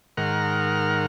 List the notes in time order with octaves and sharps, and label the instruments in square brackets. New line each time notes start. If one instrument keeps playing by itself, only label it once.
[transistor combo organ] G#2 D#3 A#4 F#5 F6